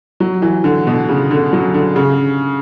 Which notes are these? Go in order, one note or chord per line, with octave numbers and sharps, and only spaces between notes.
F#3
E3
D3
B2
C#3
D3
F#3
D3
C#3